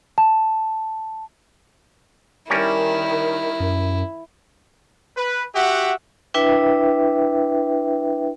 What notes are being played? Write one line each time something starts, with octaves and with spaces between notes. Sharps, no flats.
A5
D#3 G3 C#4 E4 A#4
F#2
B4
F#4 G4 E5 F#5
D4 E4 B4 E5 G5